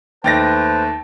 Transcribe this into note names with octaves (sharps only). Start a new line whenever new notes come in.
D#2 A3 B4 C5 G5 A5 A6 A#6